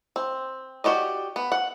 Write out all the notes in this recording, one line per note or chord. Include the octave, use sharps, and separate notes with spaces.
C4
F#4 G4 D5 D#5
B3
F#5